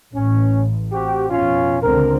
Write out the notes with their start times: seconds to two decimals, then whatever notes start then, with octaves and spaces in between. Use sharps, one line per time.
0.14 A1 C#4
0.92 C4 F#4 G4
1.30 F2 B2 C#4 F4
1.82 C#2 D3 C4 A#4